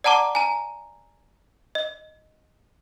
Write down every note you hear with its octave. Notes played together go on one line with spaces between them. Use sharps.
D5 F#5 A5 A#5 D6
G#5 A#5
D#5